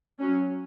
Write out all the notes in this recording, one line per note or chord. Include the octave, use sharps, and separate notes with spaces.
F#3 C#4